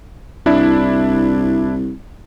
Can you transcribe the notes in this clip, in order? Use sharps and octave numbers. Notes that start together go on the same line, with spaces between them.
C2 D4 E4